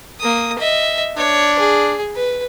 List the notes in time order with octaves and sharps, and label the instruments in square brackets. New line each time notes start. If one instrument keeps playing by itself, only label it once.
[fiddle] A#3 D#6
D#5 E5
[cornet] D4 [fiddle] C#5
[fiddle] G#4
B4